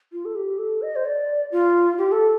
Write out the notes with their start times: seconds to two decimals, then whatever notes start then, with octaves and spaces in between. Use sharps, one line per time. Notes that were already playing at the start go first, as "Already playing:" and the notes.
0.13 F4
0.25 A4
0.36 G4
0.58 A4
0.82 D#5
0.96 C5
1.05 D5
1.52 F4
1.98 G4
2.12 A4